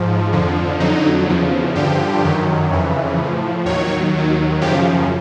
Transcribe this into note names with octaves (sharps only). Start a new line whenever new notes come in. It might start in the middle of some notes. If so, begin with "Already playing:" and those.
Already playing: G#2 F3
F2 D3 F3
F2 D3 F#3 D#4
E2 C#3 F3
G2 D3 F3 G4
F#2 D#3 F#3
F2 C#3 E3
A2 F3
D#2 D#3 F#3 C#5
D#2 D#3 F#3
F#2 C#3 F3 G4